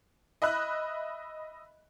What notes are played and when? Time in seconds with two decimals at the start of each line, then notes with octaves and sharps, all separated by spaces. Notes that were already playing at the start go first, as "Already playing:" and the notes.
0.42 D#5 E5 B5 F#6